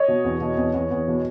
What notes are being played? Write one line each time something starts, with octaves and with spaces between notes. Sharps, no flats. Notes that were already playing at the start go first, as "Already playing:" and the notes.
Already playing: C#5 D#5
B2
E2
B2
E2
E2
E2
B2